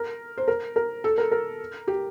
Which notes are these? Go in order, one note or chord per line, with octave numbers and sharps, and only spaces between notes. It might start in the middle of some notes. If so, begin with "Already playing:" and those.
Already playing: A#4
C5
A#4
A#4
A4
A#4
A#4
G4